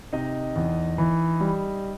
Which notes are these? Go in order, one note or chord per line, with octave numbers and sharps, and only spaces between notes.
C3 D#4 D#5
E2
E3
G3